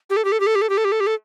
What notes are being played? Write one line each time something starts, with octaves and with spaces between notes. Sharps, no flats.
G4
A4
G4
A4
G4
A4
G4
A4
G4
A4
G4
A4
G4
A4